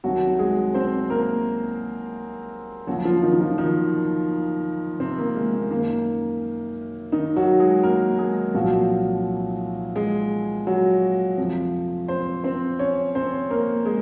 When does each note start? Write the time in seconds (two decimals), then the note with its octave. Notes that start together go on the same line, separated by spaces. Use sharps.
0.04 C2 C3 D#3 F#3 F#4
0.39 G#3 G#4
0.74 C4 C5
1.10 A#3 A#4
2.87 D#2 C#3 F3 F#3 F#4
3.05 F3 F4
3.22 D#3 D#4
3.33 D#4
3.40 F3 F4
3.58 D#3 D#4
5.00 C3 C4
5.18 A#3
5.35 G#3
5.54 A#3
5.71 F#2 D#3 A#3
7.12 D#3 D#4
7.36 F#3 F#4
7.60 G#3 G#4
7.83 A#3 A#4
8.19 G#3 G#4
8.54 C2 A#2 F3 F#3 F#4
9.96 G#3 G#4
10.67 F#3 F#4
11.38 F2 C3 F3
12.08 C4 C5
12.44 C4 C5
12.79 C#4 C#5
13.15 C4 C5
13.50 A#3 A#4
13.85 G#3 G#4